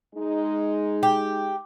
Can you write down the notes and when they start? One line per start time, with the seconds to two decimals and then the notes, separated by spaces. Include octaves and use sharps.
0.15 G#3 D#4
1.03 G4